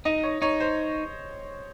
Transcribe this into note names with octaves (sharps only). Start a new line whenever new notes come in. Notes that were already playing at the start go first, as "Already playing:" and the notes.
D#4 D#5
C#5
D#4 C#5
C5